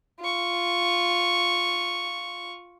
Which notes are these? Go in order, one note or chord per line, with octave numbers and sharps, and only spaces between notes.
F4 C#6